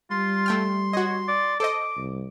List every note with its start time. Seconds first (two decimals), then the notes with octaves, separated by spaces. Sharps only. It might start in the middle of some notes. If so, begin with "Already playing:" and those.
0.11 G3 F4 C6
0.46 A3 G5 F6
0.93 F#4 C#5 D#5
1.28 D5
1.60 A4 C5 D#5 D6
1.96 C2